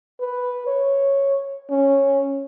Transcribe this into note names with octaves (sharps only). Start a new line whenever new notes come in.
B4
C#5
C#4